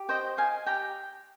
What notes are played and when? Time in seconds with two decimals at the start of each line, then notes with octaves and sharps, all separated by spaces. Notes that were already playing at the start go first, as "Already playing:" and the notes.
Already playing: G4
0.09 C5 D#5 G5
0.37 D#5 F5 G#5
0.66 G4 G5 A#5